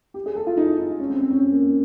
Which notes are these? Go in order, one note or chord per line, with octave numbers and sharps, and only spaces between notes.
G4
G#4
A4
F4
D#4
D#4
C#4
C4
C4
C#4
C4
A#3
A#3